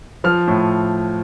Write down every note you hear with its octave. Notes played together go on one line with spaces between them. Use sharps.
F3 F6
A2